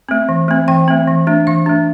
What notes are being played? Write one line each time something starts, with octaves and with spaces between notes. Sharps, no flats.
A3 C4
E3
A3 C4
E3 G5
A3 C4
E3
A3 D4
E3 F5
A3 D4